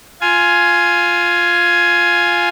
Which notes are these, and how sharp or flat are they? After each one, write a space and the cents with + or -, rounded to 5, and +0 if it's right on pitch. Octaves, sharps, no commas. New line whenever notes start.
F4 +0 G#5 +10